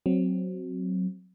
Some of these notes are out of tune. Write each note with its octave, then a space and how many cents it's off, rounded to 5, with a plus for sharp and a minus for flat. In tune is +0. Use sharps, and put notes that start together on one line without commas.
F#3 +0 C4 +0